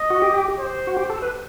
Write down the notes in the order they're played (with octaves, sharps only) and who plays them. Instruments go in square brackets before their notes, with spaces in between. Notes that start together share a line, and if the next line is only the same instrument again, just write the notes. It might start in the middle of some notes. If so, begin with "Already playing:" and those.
Already playing: [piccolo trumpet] D#5
[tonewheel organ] F#4
G4
[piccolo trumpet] C5
[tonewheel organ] F#4
G4
A4
B4